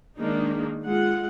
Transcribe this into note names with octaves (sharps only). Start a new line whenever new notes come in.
D#3 G#3 A#3 D4 D#4
G#3 F4 F#5